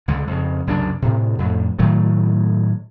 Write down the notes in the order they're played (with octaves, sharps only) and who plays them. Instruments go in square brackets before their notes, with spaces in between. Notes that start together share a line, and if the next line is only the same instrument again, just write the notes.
[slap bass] C#2 D3 G#3
F2 C#3
C2 F#2 C#3 D4
A2 C3
F2 A2
A2 D#3 F#3 A3